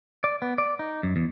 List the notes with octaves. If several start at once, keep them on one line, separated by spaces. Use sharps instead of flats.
D5
B3
D5
D#4
F#2
E2